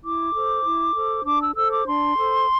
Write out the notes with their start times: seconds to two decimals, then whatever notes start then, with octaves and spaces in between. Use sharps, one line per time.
0.03 E4 D6
0.34 A4 C5
0.65 E4
0.95 A4 C5
1.25 D4 D6
1.40 E6
1.55 A4 C5 E6
1.71 D6
1.86 D4 C6
2.16 A4 C5